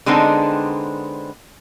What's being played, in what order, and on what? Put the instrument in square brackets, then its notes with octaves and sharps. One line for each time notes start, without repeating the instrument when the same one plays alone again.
[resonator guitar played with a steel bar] D3 G#3 B3 C4 D4 D#4